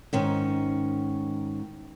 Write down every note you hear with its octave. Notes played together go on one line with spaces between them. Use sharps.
G#2 D#3 C#4